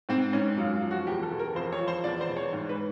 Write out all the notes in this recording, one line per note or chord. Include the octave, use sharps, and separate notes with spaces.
G#2 C4
G#2 C#4
F#2 F4
F4
F3
F#4
E2 G4
A4
E2
A#4
F2 C5
C#5
F3
C5
E2 D5
C5
E2
C#5
G#2
B4